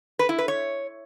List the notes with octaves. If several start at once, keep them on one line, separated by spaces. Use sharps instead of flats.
B4
E4
B4
C#5